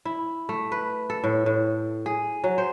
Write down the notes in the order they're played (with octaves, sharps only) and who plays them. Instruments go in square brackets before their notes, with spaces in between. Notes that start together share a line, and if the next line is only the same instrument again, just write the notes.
[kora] E4
A3
B4
A4
A2
A2
G#4
F#3
C5